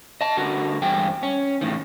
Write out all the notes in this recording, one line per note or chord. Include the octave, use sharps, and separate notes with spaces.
D#5 A5
D3 F#4 A#4
E2 G2 G#4 G5
C#4
E2 A2 D#3